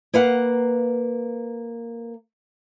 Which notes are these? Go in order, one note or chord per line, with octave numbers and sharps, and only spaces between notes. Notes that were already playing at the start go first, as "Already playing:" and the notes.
A#3 B4 F5 F#5